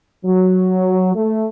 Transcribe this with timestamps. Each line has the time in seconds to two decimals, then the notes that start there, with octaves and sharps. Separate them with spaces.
0.25 F#3
1.14 A3